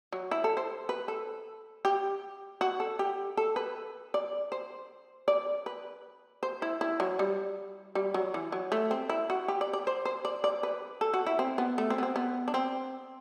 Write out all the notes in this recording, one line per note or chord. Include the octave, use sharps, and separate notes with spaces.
F#3
E4
A4
C5
B4
A4
G4
F#4
A4
G4
A4
B4
D5
C5
D5
B4
C5
E4
E4
F#3
G3
G3
F#3
E3
F#3
A3
C4
E4
F#4
G4
D5
D5
C5
C5
D5
D5
B4
A4
F#4
E4
C4
B3
A3
C4
B3
C4
B3
D4
C4